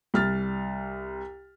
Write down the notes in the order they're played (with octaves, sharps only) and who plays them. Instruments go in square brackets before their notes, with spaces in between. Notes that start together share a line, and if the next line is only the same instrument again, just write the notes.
[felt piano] C2 F6 A6